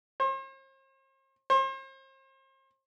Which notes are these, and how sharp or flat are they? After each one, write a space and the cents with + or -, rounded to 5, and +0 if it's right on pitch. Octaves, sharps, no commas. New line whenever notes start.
C5 +45
C5 +40